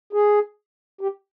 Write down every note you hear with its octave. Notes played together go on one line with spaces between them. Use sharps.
G#4
G4